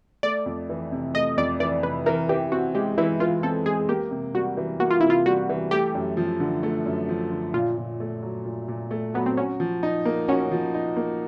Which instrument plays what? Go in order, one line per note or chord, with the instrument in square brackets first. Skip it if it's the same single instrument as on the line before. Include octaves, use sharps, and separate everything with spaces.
[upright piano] A3 [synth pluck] D5
[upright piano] F2
E3
C3
[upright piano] A3 [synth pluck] D#5
[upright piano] F2 [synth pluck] D5
[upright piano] E3 [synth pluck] D5
[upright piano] C3 [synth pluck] B4
[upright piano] E3 [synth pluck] A#4
[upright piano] E3 [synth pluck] G4
[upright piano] C4 [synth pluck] F#4
[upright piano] G#3 [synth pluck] G4
[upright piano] E3 [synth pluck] E4
[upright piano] E3 [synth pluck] F4
[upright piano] C4 [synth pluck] A4
[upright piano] G#3 [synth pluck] G#4
[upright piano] A#3 [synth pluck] G4
[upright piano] C3
[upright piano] G3 [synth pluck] F#4
[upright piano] E3
[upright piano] A#3 [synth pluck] F#4
[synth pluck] F4
[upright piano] C3 [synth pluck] E4
[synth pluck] F4
[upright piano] G3 [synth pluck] F#4
[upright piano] E3
[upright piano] A3 [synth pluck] G4
[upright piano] F#2
F3
D3
A3
F#2
F3
D3
[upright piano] A#2 [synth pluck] F4
[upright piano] A#2
A3
F#3
A#2
A#2
A3
[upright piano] F#3 [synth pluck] B3
[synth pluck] C4
[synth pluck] C#4 [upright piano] F#4
[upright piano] F3
D#4
A#3
[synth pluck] C#4 [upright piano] F#4
[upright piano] F3
D#4
A#3